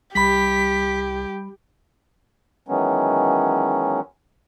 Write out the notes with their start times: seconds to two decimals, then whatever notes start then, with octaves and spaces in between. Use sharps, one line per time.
0.15 C2 G3 G4 B5 B6
2.68 D#3 E3 F#3 G#3 B3 C#4